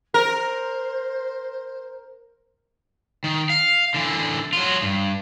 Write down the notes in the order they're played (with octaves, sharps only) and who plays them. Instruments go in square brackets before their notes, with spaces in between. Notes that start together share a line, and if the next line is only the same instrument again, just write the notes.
[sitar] A#4 [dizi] C5
[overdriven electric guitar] D#3
F5
D3 E3
F#3 F4
G2